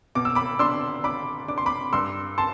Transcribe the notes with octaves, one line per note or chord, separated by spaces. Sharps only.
B2 D6
E6
B5 D6
D4 C6 E6
D4 B5 D6
D4 D6
C6
B5 D6
G2 C6 E6
A5 C6